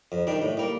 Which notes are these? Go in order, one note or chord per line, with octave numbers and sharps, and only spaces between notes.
F2
D#3 G3 D4
A2
G3 A#3